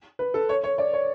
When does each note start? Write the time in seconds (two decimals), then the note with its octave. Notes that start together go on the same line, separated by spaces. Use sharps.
0.19 B4
0.34 A4
0.49 C#5
0.64 C#5
0.78 D5
0.93 C#5